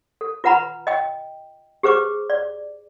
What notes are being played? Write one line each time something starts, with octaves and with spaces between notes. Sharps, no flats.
A4
F4 B4 F#5 A#5 B5
D#5 G5
G4 G#4 B4 C5 D6
D5